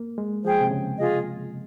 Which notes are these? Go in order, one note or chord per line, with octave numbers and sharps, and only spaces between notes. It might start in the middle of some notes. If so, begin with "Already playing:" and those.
Already playing: A#3
G#3
F3 G#4 C5 G5
C3
C#3
F4 G#4 D#5